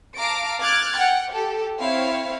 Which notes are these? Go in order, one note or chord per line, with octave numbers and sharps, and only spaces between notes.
F5 A5 A#5 D6 A#6 D7
D6 F6 F#6 G#6 A6
F#5 G5
G4 A4
C4 E4 C#5 F5